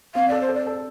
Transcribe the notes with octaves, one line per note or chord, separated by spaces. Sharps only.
C4 F5
A4 D5
C5
A4
D5
A4